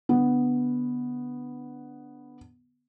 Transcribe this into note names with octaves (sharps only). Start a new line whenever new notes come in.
D3 B3